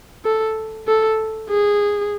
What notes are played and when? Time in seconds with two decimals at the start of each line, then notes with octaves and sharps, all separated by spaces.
0.25 A4
0.87 A4
1.50 G#4